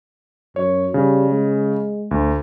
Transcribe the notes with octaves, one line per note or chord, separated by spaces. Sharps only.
F#2 C#5
C#3 G3
G#3
D2